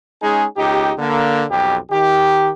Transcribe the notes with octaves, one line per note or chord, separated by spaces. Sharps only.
G#3 C#4 D#4 G#4
C#2 D#4 G4
D3 A#3
B1 F2 G4
D#3 G4